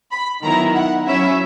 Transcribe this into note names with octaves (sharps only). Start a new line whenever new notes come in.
B5
D#3 F#3 B3 E4 A#5
F#5
F#3 C#4 E4 E5